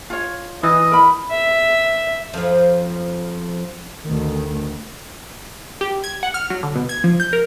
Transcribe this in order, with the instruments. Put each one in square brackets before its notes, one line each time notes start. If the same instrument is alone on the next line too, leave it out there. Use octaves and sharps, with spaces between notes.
[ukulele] F4 C#5
[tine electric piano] E3 [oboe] D#5
[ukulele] A#4 B5
[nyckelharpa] E5
[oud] F2 F3
[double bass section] D2 D#3
[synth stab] G4
G#6
F#5
F6
F#3
D3
B2
G#6
F3
G6
A#4